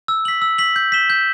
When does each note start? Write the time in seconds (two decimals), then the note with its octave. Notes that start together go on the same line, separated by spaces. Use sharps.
0.08 E6
0.25 B6 F#7
0.42 E6
0.58 B6 F#7
0.76 G6
0.92 B6 E7 G7
1.10 G6